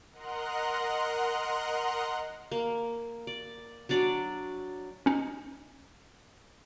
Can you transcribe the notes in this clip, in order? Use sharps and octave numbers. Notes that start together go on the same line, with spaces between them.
A#4 D#5 F#5 A#5 C6 F#6
A#3
D5
F#3 D4 D5
C#4 D#4